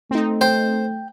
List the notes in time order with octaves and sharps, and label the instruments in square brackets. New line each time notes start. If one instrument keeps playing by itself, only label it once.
[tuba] A3 [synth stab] C4 D#4
[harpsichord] C5 [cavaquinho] G5